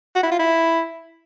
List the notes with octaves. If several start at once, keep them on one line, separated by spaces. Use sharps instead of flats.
F#4
E4
F4
E4